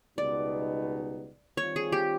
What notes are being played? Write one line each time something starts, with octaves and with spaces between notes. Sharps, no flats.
C#2 B2 G3 B3 D#4 D5
D#3 G3 C4 F4 C#5
G#4
G4